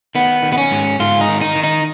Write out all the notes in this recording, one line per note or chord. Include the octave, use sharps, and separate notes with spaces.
D#3 B3
D#3
B3
C#4
G#2
G#2 F4
D#4
D#3
D#4
D#3
D#4